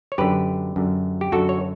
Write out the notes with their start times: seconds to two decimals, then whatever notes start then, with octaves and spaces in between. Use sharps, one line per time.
0.12 C#5
0.18 F#2 D3 G4 B4
0.76 F#2 D3
1.21 G4
1.32 F#2 D3 F#4 A4
1.49 C#5